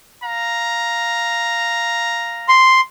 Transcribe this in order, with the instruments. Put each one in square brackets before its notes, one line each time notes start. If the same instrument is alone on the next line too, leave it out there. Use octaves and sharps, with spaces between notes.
[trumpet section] F5 A#5
[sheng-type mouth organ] C6